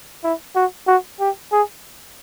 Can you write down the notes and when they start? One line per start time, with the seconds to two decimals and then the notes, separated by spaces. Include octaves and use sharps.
0.24 E4
0.56 F#4
0.87 F#4
1.20 G4
1.52 G#4